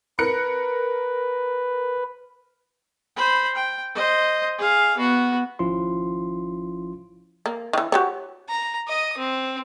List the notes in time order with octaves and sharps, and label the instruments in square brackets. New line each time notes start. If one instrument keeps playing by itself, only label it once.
[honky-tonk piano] A#4 F#6 C#7 [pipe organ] B4
[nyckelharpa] C5 B5
G5
C5 D#5
G#4 F5
B3 F#4
[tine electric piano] G#1 F3 C#4 E4 F4 C6
[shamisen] A#3
D#3 E3
F#4 G4 C#5
[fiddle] A#5
D#5 D#6
C4